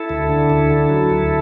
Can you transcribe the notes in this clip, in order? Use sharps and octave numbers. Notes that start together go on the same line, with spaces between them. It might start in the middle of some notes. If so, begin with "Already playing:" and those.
Already playing: E4 A4
D2
D3
D2
D3
F#3
D2